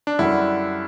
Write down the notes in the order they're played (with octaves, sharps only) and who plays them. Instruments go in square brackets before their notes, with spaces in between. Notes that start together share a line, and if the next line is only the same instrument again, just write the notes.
[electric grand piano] D4
[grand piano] F#2 D3 G3 D4 F#4 [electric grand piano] E4